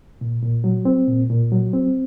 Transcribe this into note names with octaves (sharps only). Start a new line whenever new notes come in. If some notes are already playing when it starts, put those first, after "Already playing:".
A#2
A#2
F#3
C4
A#2
A#2
F#3
C4